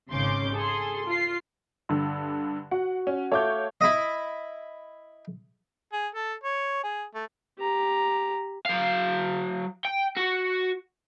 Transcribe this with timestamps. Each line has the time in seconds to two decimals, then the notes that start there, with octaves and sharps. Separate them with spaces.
0.11 G#1 C#3 C#4 C6 D6 G6
0.53 G#4 A4 C6
1.08 F4 C7
1.89 G2 D3
2.71 F#4 F#5
3.07 C#4
3.32 A3 C#5 F5 D6 G6
3.81 E4 D#5
5.93 G#4
6.15 A4
6.43 C#5
6.84 G#4
7.14 A3
7.58 G4 A#5
8.65 F#3 F5
9.85 G5
10.17 F#4